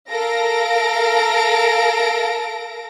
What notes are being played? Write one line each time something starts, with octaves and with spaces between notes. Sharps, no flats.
A4 A#4 F5 A#6 D7